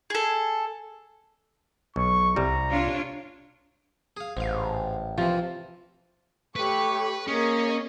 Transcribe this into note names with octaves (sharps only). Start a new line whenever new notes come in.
G#4 A4
B1 C#6
C2 G3 A#5
D4 F4 C#5
G#4 F5
A1 G#2 F5
C3 E3 F3
A3 G4 B4 C#5 C#6
A#3 C#4 G#4 C#5 D#5